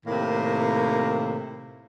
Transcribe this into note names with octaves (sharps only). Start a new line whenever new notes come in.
A2 C3 D#3 A#3